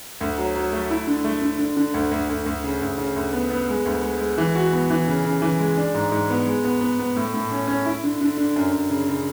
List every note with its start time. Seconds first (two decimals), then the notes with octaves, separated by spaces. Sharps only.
0.21 D2
0.38 F#3
0.56 F#3
0.73 A3
0.90 E4
1.07 D3
1.24 A3
1.42 D3
1.59 D3
1.77 D3
1.94 D2
2.11 D2
2.29 D2
2.46 D2
2.64 C#3
2.82 D2
2.98 C#3
3.16 D2
3.33 B3
3.50 B3
3.69 G#3
3.85 D2
4.03 G#3
4.20 G#3
4.38 E3
4.55 F#4
4.72 B3
4.90 E3
5.08 C#3
5.25 C#3
5.42 E3
5.59 G#3
5.77 D4
5.95 G#2
6.12 G#2
6.30 B3
6.47 G#3
6.65 B3
6.81 B3
6.99 B3
7.16 A2
7.34 A2
7.51 C#4
7.68 C#4
7.86 E4
8.04 D3
8.21 D3
8.37 D3
8.56 F#2
8.72 F#2
8.90 C#3
9.08 C#3